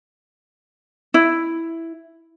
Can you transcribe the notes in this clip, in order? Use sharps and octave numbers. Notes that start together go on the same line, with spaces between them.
E4